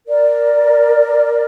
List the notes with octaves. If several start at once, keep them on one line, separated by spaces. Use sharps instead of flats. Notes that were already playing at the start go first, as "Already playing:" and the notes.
A#4 D5